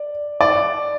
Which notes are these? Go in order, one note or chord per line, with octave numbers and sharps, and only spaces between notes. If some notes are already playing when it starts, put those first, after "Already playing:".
Already playing: D5
D5